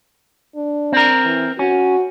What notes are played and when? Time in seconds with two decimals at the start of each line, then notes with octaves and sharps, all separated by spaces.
0.56 D4
0.92 C4 A#4
1.25 E3
1.59 C#4 F#4